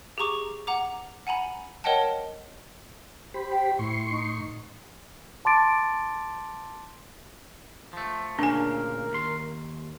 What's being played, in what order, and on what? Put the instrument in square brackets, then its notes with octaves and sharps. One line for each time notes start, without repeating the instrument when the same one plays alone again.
[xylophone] G4 G#4 A#5 C#6 D6
F#5 A#5 D6
F#5 G#5 A#5 B5
A#4 C#5 D#5 F#5 G5 A5
[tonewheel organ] G4 C5 B5
[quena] G5
[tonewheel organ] A2 C6 C#6 [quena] E4
[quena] D#4
[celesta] A5 C6 D6 A6 D7
[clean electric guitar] F3 A3
[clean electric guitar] D2 A#2 C#3 [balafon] D4 G#5 [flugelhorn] A#4
[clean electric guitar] D#2 C6